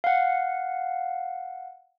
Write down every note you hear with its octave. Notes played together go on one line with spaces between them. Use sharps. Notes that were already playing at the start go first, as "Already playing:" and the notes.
F5 F#5